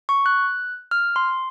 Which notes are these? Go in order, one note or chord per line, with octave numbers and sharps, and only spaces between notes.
C#6
F#6
F6
C6